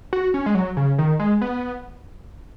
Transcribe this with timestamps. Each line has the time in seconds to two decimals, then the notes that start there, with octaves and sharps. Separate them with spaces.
0.13 F#4
0.34 C#4
0.46 G#3
0.55 F#3
0.77 C#3
0.98 D#3
1.20 G#3
1.41 B3